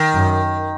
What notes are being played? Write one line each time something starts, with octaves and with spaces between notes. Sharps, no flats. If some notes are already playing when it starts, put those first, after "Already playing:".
Already playing: D#3
F#2